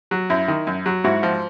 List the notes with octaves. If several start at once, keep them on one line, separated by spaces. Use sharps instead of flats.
F#3
F#2 E4
D#3
F#2
F#3
G#2 E4 F#4
F3